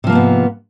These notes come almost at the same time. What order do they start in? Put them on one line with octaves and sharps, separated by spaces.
C3 F3 A#3 G#2 B3